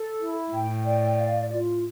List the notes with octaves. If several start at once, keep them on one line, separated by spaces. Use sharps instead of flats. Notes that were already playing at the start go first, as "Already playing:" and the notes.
Already playing: A4
E4
A2 G5
D5
F5
F4